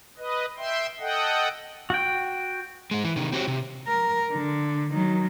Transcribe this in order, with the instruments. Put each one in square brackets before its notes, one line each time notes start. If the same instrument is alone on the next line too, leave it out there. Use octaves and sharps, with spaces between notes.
[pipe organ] B4 D#5
E5 G5 C6
A4 D#5 F#5 G5
[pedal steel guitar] F#4 G5
[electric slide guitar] G#2 G#3
E3
C3 D#3
C4 F#4 G4 C#5
C3
[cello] A#4
D3
D#3 F#3